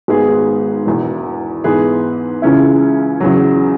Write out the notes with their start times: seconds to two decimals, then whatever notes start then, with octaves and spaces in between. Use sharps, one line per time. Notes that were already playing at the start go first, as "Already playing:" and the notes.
0.08 G#1 G#2 G#3 B3 G#4
0.86 E1 E2 E3
1.64 G#2 E3 B3 G#4 B4
2.42 C#2 C#3 E3 C#4 E4
3.20 E2 C#3 F#3